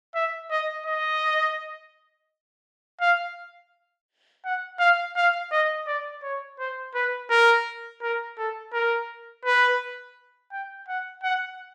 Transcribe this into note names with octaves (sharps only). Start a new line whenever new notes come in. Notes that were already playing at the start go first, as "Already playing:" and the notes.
E5
D#5
D#5
F5
F#5
F5
F5
D#5
D5
C#5
C5
B4
A#4
A#4
A4
A#4
B4
G5
F#5
F#5